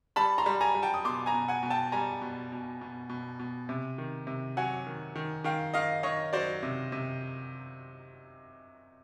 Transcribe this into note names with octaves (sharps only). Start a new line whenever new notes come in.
G3 A5 B5
A#5 C6
G3
G#5 A#5
G3
G5 A5
D#6
B2 C6 D6
G#5 A#5
B2
F#5 G#5
B2
G5 A5
G3 G#5 A#5
B2
B2
B2
B2
B2
C3
D#3
C3
F#3 F#5 G#5
D#3
D#3
D#3 F5 G5
D#3 D#5 F5
D#3 C#5 D#5
F#3 C5 D5
C3
C3